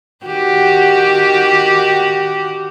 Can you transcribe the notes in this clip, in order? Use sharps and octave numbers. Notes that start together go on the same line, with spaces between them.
D#3 F#4 G4